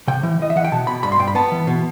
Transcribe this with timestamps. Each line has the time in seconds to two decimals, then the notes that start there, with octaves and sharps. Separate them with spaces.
0.08 C3 G5
0.23 E3
0.39 E3 D#5
0.50 E5
0.56 E3 F#5
0.65 G5
0.72 B2 A5
0.87 B2 B5
1.03 G2 B5
1.12 C6
1.19 G2 G5
1.28 B5
1.35 B3 A5
1.51 E3
1.67 B2